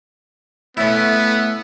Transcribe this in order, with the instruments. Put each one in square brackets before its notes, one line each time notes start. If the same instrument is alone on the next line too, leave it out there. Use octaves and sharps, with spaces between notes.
[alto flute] A3 [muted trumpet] B3 [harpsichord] C#4 E4 [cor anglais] E5